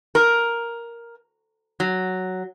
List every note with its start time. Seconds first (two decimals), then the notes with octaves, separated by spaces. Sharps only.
0.15 A#4
1.80 F#3